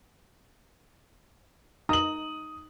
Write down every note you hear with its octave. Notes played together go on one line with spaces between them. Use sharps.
D#4 A#5 D#6 F#7